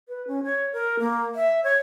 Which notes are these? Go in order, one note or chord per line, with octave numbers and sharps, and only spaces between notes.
B4
C#4
C#5
A#4
A#3
E5
C#5